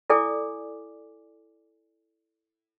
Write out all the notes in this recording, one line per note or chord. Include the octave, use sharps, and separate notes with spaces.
E4 A4 D5 G#5 D6